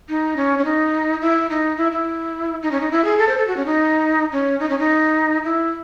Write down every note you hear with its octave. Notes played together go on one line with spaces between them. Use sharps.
D#4
C#4
C#4
D#4
E4
D#4
E4
E4
D#4
C#4
D#4
E4
G#4
A4
C5
A4
F#4
C#4
D#4
C#4
D#4
C#4
D#4
E4